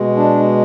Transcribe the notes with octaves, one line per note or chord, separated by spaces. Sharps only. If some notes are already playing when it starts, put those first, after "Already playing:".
Already playing: B2 G#3
D4